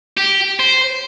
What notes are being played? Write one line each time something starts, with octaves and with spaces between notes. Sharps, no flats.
G4
C5